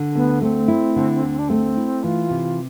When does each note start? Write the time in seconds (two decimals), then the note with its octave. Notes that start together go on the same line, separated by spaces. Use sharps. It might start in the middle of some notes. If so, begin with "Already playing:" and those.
Already playing: D3
0.15 D2 B3
0.42 A3 C4
0.68 E4
0.96 D3
1.23 D2
1.39 D4
1.49 A3 C4
1.77 E4
2.03 E3 F4
2.30 C3